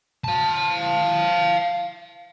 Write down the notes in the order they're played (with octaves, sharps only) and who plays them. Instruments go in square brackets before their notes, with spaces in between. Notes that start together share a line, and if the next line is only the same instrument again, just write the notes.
[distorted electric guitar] F5 A5